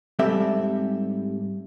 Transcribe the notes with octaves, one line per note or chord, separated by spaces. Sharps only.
G#2 G3 C4 G4 A4 E5